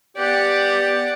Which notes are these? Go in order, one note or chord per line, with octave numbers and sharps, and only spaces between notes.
B3 G4 D5 F#5